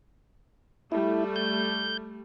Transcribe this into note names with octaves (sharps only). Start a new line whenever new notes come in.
G3 A3 E4
G6